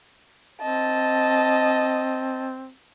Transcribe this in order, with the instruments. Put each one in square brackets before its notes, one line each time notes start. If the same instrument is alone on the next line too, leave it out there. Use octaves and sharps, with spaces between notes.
[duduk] C4 [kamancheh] D#5 A5